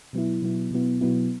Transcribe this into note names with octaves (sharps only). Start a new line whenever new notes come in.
B2 F#3 B3 E4
B2 F#3 B3 E4
B2 F#3 B3 E4
B2 F#3 B3 E4